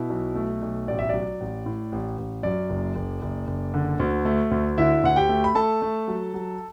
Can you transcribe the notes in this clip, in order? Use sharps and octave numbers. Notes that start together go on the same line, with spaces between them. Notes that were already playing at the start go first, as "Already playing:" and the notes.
Already playing: B2 E4
B1
A3
B1
A1 D5
E5
F#3 D5
A1
A2
A1
A1
F#2 D5
F#1
F#1
F#1
F#1
D3
D2
A3
D2
D3 E4 E5
D2 F#5
G4 G5
A3
B5
A3 A4 A5
A3
F#3
F#3